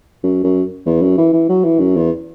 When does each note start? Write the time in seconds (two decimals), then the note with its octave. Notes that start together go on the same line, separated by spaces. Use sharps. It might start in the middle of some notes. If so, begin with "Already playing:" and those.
0.24 F#2
0.44 F#2
0.86 E2
1.02 F#2
1.18 E3
1.33 E3
1.49 F#3
1.64 E3
1.80 F#2
1.96 E2